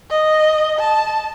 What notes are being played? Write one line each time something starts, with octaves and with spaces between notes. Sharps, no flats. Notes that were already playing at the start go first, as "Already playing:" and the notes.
D#5
A5